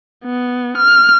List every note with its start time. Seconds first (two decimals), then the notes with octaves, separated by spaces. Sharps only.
0.24 B3
0.78 F6